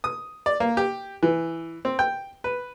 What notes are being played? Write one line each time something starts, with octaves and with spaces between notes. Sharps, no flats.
D#6
D5
A#3
G4
E3
C4
G5
B4